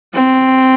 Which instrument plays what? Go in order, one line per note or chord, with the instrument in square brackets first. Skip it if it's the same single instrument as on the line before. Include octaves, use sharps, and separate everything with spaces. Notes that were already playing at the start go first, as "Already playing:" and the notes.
[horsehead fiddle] C4